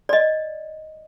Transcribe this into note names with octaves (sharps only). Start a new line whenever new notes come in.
D5 D#5